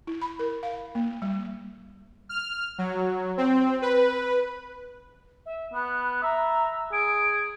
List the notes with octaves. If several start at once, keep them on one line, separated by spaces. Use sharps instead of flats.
E4
B5
A#4
F5
A#3
G3
F6
F#3
C4
B4
E5
B3 F#6
E5 A#5
G#4 D7